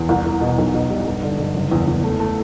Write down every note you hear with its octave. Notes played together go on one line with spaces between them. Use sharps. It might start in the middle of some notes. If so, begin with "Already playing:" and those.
Already playing: E2
C2
C2
B2
B1
B2
G3
G2
D3
G2
F#1
E2
E2
A3
A3